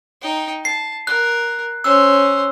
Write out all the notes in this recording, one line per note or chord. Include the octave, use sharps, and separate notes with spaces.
D#4 G5
A5 C7
A#4 F#6
C#4 C5 E6